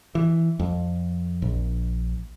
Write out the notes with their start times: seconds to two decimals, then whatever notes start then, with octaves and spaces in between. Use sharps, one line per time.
0.15 E3
0.60 F2
1.42 A#1